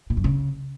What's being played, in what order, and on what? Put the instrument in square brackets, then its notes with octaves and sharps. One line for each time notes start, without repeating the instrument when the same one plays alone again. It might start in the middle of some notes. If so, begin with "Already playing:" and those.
[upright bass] A#2
F#2
C#3